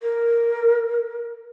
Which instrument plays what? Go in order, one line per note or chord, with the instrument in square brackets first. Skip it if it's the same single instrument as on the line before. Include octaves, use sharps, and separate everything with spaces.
[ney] A#4